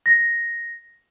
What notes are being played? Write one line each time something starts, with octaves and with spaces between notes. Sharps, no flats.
A#6